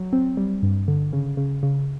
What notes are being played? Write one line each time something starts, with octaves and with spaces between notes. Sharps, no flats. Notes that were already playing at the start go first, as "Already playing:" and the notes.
Already playing: F#3
C4
G3
G2
D3
C#3
C#3
C#3